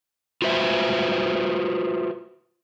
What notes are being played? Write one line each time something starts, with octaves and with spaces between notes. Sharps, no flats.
F4 F#4 B4 C5 E5